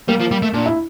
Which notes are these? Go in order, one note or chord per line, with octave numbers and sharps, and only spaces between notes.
G3 A#3
F3
G3
A3
A#2 D4
E4